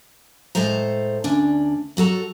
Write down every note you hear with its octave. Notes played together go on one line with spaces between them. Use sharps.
A2 G#3 A4 C5 A#5
D2 C#4 D4
F#3 F#4 A4 A#5